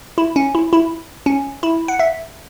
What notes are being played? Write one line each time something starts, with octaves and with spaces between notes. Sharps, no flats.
E4
C#4
E4
E4
C#4
E4
F#5
E5